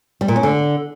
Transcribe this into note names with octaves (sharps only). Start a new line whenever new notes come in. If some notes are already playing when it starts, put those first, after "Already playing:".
G3
A#2
C#4
D3